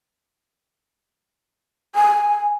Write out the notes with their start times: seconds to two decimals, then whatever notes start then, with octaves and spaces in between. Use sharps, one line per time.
1.95 G#5